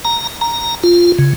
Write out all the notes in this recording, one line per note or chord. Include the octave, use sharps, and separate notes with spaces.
A#5
A#5
F4
C#3